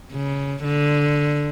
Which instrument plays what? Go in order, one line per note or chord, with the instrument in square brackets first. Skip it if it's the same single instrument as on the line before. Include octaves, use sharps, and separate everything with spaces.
[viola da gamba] C#3
D3